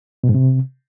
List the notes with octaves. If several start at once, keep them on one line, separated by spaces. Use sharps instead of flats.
B2
G#2
C3